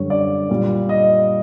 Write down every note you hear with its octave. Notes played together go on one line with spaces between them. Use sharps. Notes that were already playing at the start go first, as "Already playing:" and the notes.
Already playing: F#2 D3 G3 C#5
D5
A#2 G3
D#5